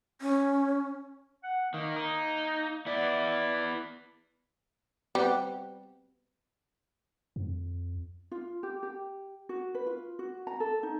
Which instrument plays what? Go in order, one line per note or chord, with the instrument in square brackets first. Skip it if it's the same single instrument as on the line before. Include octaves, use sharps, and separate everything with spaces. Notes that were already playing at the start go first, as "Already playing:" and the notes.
[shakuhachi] C#4
[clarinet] F#5
[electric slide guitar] D#3 [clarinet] A#3
[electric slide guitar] D#4
[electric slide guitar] B3 E4 [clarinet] D5
[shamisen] G3 [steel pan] B3 C4 F#5
[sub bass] F2
[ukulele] F4
G4
G4
F#4
B4
F4
F#4
A#5
A4
D#4